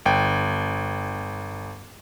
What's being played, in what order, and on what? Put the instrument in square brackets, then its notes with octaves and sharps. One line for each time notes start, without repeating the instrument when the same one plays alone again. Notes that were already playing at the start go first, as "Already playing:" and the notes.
[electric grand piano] G1 G5